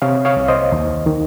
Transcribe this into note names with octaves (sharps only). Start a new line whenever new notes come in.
C3 C#5 F5
C#5 F5
C2
C5 D#5
D#2
D#3